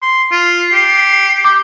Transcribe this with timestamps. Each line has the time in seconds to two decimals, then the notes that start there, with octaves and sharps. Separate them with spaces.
0.02 C6
0.32 F4 C7
0.73 G4
1.44 D6 G6